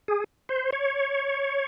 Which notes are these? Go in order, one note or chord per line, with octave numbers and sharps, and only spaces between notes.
G#4
C5
C#5